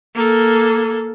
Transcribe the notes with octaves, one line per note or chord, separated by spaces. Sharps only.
A#3 A4